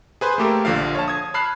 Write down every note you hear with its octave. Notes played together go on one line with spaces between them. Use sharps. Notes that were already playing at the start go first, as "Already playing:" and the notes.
G#4 B4 C5
A3 A#3 G4 A4 A#4
A#1 D3 F3 F5
C#5 A5
D#6 G#6
A5 B5 F6 F#6 C7